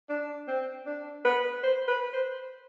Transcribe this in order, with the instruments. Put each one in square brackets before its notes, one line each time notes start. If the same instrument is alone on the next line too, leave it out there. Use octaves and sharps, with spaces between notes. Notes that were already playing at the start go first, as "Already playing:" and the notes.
[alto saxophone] D4
C4
D4
B4
C5
B4
C5